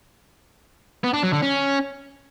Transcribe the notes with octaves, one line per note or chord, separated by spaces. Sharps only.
B3
D4
F#3
D3
C#4